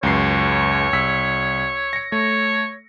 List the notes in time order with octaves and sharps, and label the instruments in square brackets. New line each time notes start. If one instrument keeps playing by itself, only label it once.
[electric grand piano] C#2 F#2 C7 [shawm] C#5
[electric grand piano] C2 E6 B6
A#6 C#7
[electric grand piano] A3 [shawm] C#5